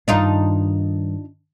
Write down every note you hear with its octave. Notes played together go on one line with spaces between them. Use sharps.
G2 D#3 D4 D#4 F4